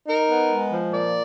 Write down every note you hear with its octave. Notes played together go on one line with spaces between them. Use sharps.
D#4 A#4
B3
G#3
F3
A#2 D5